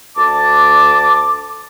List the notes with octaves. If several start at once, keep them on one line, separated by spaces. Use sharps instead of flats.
D2 A5 D6